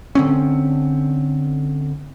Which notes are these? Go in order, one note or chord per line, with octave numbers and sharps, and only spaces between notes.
D3 C4 C#4